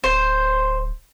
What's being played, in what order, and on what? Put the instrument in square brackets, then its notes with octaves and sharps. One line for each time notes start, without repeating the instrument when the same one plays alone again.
[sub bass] D1 [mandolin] C5